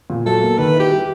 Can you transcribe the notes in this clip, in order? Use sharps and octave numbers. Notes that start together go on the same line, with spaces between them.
A#2
F#3 A4
A#3
D#3 B4
E4
G4
G3